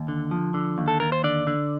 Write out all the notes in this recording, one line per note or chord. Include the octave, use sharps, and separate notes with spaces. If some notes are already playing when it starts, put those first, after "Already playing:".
Already playing: D#2
D3
F3
D3
D#2
A4
D#2 A#4
C5
D3 D5
D3